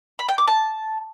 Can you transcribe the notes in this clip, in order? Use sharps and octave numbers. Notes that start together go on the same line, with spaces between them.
B5
G5
D6
A5